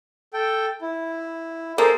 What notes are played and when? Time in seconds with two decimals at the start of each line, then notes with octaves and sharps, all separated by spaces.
0.33 A4 G5
0.81 E4
1.78 A#3 G#4 A4 C5